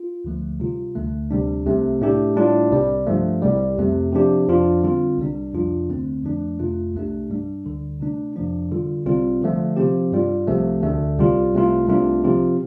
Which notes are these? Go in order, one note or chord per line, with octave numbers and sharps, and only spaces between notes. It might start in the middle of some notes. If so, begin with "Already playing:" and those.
Already playing: F4
D2 D3 F3 A3
C3 G3 F4
D2 D3 A3
D2 C3 G3 D4
C2 C3 A3
A2 A3 D4 G4
A2 G3 D4 F4
C2 C3 G3
G2 F3 A3
C2 C3 G3
F2 C3 A3
C3 F3 D4 G4
F2 F3 D4 F4
D3 G3 C4 F4
C2 C3 G3 D4
F2 C3 F3 D4 F4
D2 D3 A3 C4
F2 F3 A3 D4
F2 C3 A3 F4
C2 C3 A3 D4 G4
G2 G3 D4
D2 D3 G3
C3 A3 D4
F2 C3 F3 D4
D3 G3 F4
C2 C3 G3 C4 F4
D3 F3 A3
C3 F3 C4 G4
G2 G3 F4
C2 C3 F3 A3
D2 D3 A3
C2 C3 G3 F4
C2 C3 A3 F4
C2 C3 A3 D4 F4
C3 F3 C4 F4